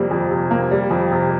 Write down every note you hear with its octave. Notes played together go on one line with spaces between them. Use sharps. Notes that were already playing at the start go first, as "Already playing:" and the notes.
Already playing: F2 C3 G3 A#3
F2
C3
A#3
G3
F2
C3